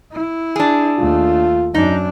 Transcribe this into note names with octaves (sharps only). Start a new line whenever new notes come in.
E4
D4 G#4
D#2 A3 F4
F#2 D4 D#4